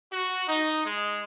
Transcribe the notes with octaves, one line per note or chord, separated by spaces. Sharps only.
F#4
D#4
G#3